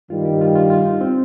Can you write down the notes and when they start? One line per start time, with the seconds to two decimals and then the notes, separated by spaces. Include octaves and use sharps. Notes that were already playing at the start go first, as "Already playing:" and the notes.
0.10 G2 D#3 G3 F4
0.25 G4
0.41 F4
0.56 F4
0.70 F4
0.85 D#4
1.01 C4